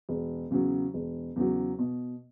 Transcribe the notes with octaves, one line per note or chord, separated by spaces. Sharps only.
E1
E2 C#3 F#3
E1
E2 C#3 F#3
B2